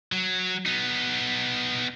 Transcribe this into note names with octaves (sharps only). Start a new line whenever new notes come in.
F#3
B3 D#4